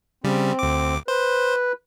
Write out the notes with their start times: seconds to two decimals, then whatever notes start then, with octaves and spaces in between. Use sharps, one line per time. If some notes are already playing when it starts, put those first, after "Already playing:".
0.24 C#3 G3 C4
0.59 D2 D6
1.08 B4 C5